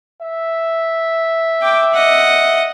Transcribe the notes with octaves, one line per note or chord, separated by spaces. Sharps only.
E5
G5 D6
D#5 F#5